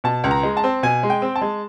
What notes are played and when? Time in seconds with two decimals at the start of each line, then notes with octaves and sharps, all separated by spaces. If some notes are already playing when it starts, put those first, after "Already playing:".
0.04 B2 A5
0.24 C#2
0.31 A#5
0.43 G#3
0.57 A5
0.64 C4
0.83 B2 G#5
1.03 G#3
1.10 G5
1.22 C4
1.36 A5
1.41 G#3